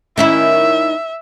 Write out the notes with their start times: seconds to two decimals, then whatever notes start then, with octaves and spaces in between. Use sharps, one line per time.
0.18 D#3 C#4 E4 E5